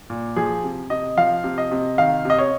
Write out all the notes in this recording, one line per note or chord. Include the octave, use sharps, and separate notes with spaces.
A#2
F3 G#4
C3
C3 D#5
F3 F5
C3
D#5
C3
D#3 F5
C3 D#5
C#5